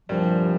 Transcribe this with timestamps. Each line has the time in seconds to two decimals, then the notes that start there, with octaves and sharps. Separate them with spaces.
0.09 C2 G2 A#2 F3 G3